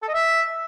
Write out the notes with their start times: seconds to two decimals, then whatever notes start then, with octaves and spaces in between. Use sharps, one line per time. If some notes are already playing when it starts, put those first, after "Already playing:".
0.02 A4
0.08 D#5
0.14 E5